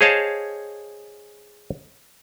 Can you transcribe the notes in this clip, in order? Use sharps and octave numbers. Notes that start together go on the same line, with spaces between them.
G#4 C5 C#5 D#5 F5 A5